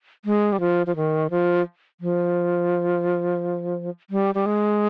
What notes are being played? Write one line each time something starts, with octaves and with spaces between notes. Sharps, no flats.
G#3
G3
F3
F3
D#3
F3
F3
G3
G3
G#3